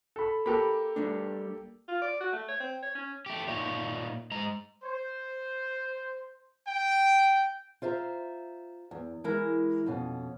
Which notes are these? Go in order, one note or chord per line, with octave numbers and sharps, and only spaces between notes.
A4 B5
A#3 G4 A4 B5
G3 A3 D4
F4
D5
F#4
A3
C#5
C4
C#5
C#4
A3 G4
A#2 D#4 C#5
G#3 A#5
C5
G5
F4 C5 E5 A#5
E2
E3 G#3 E4 A#4
F2 B2 C#4